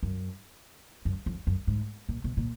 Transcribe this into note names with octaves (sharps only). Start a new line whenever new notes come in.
F#2
F#2
F2
F#2
G#2
A#2
B2
A#2